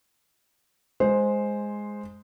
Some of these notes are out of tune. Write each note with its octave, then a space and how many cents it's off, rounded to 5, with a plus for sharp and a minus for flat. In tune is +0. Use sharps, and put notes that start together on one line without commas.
G#3 +0 C5 +0